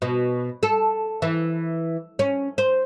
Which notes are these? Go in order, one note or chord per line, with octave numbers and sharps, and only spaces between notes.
B2
A4
E3
C#4
C5